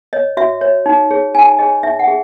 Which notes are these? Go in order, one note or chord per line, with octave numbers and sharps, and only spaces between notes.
C#5 D#5
F#4 E5
C#5
D#4
G#4 C#5
D#4 G#5
G#4 C#5 D#5
D#4 E5
F#5
G#4